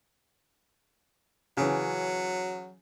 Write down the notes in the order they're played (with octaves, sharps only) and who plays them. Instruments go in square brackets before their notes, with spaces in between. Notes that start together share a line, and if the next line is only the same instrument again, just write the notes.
[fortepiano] C#3 E3 [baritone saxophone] F#3